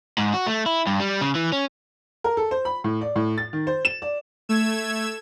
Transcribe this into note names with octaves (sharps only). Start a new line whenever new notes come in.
G#2
F#4
A3
E4
G2
G3
C#3
E3
C#4
A#4
A4
C5
B5
A2
D5
A2
A6
D#3
C5
E7
D5
A3 E6 G#6 E7